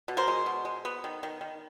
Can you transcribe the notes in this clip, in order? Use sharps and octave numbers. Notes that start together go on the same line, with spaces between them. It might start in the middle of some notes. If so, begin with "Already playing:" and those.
B2
A#4 C5
G#3
B2
G#3
B3
D#3
D#3
D#3